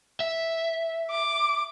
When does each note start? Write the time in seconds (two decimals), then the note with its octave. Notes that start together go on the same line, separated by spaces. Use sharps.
0.20 E5
1.11 D6